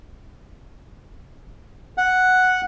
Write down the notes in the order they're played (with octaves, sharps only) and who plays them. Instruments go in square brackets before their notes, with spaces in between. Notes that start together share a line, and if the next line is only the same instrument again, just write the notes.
[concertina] F#5